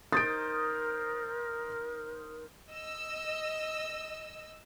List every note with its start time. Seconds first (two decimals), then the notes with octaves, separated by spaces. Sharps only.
0.12 D#4 A#4 C5 D#6 A6 D7
2.71 D#5 E6